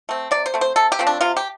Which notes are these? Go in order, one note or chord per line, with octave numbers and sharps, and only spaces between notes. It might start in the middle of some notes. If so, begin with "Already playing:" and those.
A3 C4
C3 D5
C5
A3 C4
C5
C3 A4
G4
F3 A3 C4
D4
C3 F4
G4